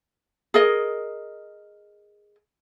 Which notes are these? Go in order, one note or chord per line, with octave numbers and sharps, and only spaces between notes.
G#4 A#4 D#5